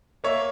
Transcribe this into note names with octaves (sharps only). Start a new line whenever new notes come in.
A#3 C#5 E5